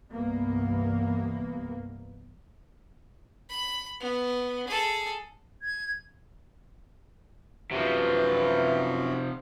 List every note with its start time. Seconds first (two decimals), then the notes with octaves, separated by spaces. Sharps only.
0.11 C2 G2 E3 A#3 B3
3.49 B5
4.00 B3
4.67 G#4 A4
5.62 G#6
7.71 F#2 C3 E3 F3 F#4